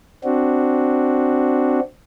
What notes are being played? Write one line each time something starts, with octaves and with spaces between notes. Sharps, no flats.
C4 D4 F#4